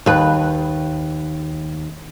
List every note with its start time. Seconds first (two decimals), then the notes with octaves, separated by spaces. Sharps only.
0.06 D#2 B4